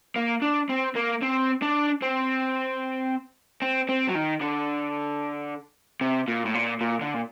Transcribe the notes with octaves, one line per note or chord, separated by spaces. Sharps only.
A#3
D4
C4
A#3
C4
D4
C4
C4
C4
F#3
D#3
D3
C3
A#2
A2
A#2
A#2
D3
A#2